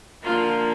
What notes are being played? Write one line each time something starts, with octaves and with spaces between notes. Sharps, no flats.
D3 F3 A#3 F4